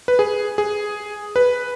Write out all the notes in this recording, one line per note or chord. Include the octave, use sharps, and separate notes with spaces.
B4
G#4
G#4
B4